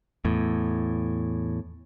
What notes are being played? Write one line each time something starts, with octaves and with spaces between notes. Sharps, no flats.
E2 A2